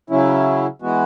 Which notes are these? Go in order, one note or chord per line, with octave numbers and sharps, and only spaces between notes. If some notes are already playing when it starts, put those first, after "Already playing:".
C#3 F#3 C#4 E4
E3 G#3 B3 F#4